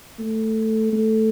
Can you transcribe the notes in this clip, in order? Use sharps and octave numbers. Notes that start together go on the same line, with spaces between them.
A3
A3